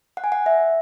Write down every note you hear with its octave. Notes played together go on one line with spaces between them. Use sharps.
F#5
G#5
F#5
E5